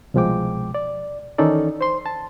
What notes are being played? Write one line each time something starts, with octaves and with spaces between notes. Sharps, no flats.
C2 B2 F3 G#3 G5 D6
D5
D#3 E3 C#4 D#4 A4 D5
C5 C6
A5